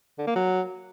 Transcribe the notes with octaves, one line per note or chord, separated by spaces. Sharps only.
D3
A#3
F#3